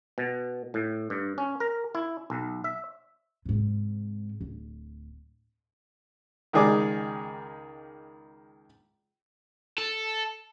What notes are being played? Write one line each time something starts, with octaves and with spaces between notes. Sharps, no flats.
B2
A2
G2
C#4
A#4
E4
B1
E5
G#2 C3
D1
C#2 D#3 G#4 D5 D6
A4